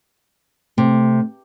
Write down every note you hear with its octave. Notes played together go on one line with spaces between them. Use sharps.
C3 A3